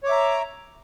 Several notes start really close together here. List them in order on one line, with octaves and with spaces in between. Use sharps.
C#5 D6 E5 A#5